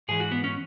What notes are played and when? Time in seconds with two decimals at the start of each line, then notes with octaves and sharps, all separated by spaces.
0.08 G#2 E3 G#4
0.20 F#4
0.32 B3
0.44 C#4